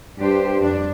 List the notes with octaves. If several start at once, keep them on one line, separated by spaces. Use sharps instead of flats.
G2 D4 G4 C5
F2 D4